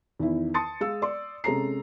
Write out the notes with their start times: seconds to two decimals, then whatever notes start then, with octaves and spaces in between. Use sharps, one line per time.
0.19 E2 D#3 E4
0.54 A5 C6 D#6 A6 C#7
0.81 G#3 F5 E6
1.02 D5 C6
1.44 C3 G#3 C#4 A4 A#5 C7